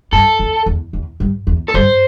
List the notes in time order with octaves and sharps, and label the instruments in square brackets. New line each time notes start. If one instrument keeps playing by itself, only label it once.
[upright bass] G2 [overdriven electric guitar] A4
[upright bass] E2
E2
E2
G2
E2
[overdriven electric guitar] A4
[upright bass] G2 [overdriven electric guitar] C5